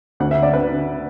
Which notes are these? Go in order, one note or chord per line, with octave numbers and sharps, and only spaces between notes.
D2 F#5
E5
D3
D5
D3 B4
D3